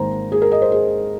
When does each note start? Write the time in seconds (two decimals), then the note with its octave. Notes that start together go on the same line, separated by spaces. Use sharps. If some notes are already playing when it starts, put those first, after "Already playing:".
Already playing: G#1 G#2 D#3 A#3 C5 A#5
0.32 G#4
0.42 A#4
0.52 D#5
0.62 C5
0.72 G#4